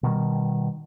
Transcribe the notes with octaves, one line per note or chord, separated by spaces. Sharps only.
B2 D#3 G3